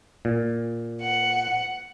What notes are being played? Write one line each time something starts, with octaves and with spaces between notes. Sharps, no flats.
A#2
F#5